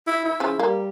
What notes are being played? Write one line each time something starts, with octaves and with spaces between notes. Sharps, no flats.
E4
E4
C#3 F3
G3 A#3